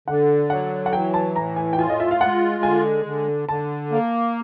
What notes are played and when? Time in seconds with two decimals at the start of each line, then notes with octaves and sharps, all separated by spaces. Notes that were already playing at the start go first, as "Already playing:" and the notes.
0.08 D3 F#5
0.50 F#3 F#5
0.86 F#5
0.93 E3 G5
1.14 A5
1.36 A2 A#5
1.56 G#5
1.73 G5
1.78 F4 G#5
1.89 D#5
2.00 E5
2.11 F5
2.21 G#3 F#5
2.63 D3 G#5
3.05 D3
3.49 D3 A5
3.91 A#3